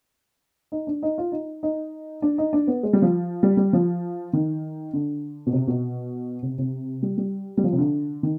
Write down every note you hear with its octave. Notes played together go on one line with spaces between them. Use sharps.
D#4
D4
D#4
F4
D#4
D#4
D4
D#4
D4
B3
G#3
G3
F3
G3
G3
F3
D#3
D3
B2
C3
B2
C3
C3
G3
G3
G3
F3
C3
D3
D#3